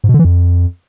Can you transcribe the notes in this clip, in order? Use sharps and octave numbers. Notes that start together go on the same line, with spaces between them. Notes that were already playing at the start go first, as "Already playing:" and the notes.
G#2
B2
D3
E3
F2